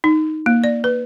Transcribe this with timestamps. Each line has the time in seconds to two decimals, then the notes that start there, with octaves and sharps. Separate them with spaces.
0.04 D#4
0.46 A#3
0.64 D5
0.84 B4